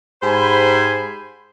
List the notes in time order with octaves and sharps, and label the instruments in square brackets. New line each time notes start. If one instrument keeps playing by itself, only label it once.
[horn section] G#2 G4 C5 G#5 B5